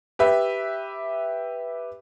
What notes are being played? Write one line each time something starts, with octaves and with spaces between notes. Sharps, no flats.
G4 B4 E5